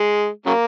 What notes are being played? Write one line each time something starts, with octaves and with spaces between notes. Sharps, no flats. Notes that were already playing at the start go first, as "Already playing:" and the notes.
Already playing: G#3
C#3 F#3 A#3